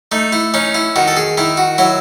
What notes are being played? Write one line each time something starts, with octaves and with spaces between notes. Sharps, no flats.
A3 D#4
E4
C#4 D#4
E4
D#3 F#4
A4
G#4
D#3 E4
F#4
F#3 E4